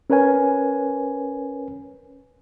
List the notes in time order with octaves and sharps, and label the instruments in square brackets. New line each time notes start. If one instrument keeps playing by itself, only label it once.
[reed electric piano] C#4 A#4 B4 C#5 G#5